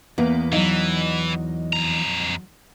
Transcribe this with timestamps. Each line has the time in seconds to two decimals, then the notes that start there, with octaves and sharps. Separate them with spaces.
0.18 E2 A#3 B3
0.52 E3 F#3 D#4 F5
1.73 F2 A#5